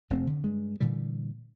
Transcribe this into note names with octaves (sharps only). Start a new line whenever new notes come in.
F1 C3 A3 C4
D3
G2 G#3
A#2 D3 E3 G3